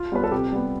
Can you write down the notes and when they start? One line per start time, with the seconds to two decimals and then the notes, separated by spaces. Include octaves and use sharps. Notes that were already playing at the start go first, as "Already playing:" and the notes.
Already playing: F4
0.12 G3 B3 B4
0.24 A4
0.32 C3 G4
0.52 G3 B3